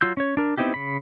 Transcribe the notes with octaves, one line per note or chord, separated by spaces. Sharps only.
F#3 F4 E6 G6
C#4 C#5
D4 A#4
B3 C4 D#4 E4 G4
C#3 B5